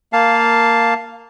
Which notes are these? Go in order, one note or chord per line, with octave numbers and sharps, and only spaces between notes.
A#3 F5 A5